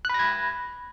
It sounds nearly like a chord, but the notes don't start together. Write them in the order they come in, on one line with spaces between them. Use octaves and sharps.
F#6 B5 A#6 G#6